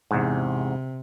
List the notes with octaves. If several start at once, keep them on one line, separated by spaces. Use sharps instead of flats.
E2 G#2 C3